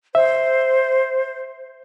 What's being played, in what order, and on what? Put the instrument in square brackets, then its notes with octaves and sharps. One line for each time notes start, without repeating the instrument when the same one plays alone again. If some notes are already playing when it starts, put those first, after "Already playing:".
[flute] C5 [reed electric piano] E5